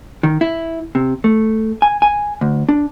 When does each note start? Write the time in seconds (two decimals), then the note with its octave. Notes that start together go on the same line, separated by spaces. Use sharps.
0.23 D#3
0.41 E4
0.95 C3
1.24 A3
1.82 G#5
2.02 G#5
2.41 D2
2.69 D4